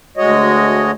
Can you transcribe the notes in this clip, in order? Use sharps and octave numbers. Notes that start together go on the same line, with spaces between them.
D2 G#3 F#4 C#5 D#5